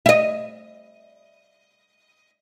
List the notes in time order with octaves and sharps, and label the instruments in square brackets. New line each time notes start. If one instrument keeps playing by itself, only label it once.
[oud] D#5 E5